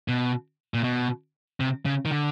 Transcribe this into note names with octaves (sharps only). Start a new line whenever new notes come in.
B2
A#2
B2
C3
C#3
D#3
D3